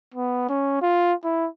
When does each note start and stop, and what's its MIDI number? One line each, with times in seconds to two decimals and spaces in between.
0.14 0.47 59
0.49 0.81 61
0.82 1.14 65
1.24 1.48 64